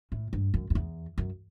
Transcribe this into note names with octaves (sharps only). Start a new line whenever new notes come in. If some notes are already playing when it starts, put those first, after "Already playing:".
A2
G2
F#2
F#2
E2
F#2